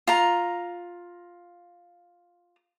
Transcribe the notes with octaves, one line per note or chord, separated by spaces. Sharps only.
F4 A#5